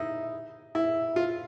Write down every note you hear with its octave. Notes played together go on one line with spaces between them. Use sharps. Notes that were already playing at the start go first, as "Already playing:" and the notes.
Already playing: D#4 E4
E4
F4